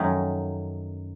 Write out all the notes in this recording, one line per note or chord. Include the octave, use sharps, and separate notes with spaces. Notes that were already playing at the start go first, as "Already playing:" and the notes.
Already playing: F#2 D#3 F#3 A3 C#4 D#4